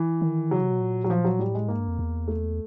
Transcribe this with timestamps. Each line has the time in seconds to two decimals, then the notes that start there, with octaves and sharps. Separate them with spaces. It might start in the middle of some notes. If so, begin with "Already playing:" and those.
Already playing: E3
0.21 D#3
0.51 C#3 F#3
0.61 C3
0.71 B2
0.80 A#2
1.04 F#3
1.10 F3
1.24 F#3
1.39 A2 G3
1.54 G#3
1.68 G#2 A#3
1.79 G2
1.88 F2
1.99 E2
2.28 A3